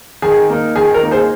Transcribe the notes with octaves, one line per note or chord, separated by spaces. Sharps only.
D#3 G#4
A#3 D#4
D#3 G#4
A#4
A#3 D#4
G#4 C5